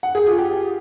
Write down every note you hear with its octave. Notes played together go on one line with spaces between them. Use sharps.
F#5
G#4
F4
G4